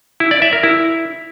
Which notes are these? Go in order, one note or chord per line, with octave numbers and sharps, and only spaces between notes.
E4
D5
E5
A#4
E4